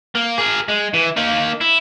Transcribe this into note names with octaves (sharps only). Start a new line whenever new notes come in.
A#3
G#4 A#4
G#3
E3
A#3 D#4
E4